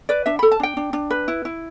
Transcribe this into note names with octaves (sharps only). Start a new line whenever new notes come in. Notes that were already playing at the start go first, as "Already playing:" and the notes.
B4 D5
D4 E5
A4 B5
A5
D4 G5
D4
D4
B4
E4
E4